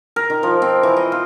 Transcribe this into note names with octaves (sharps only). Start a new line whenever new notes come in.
A#4
D#3
F3
C4
E3
D#5
F4